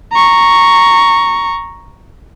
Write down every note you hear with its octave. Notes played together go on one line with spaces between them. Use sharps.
A#5 C#6